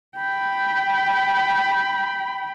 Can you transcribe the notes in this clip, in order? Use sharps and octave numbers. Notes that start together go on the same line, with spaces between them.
G5 B5